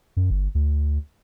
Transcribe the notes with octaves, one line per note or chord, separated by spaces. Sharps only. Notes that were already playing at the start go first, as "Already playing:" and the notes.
F#2
G1
D2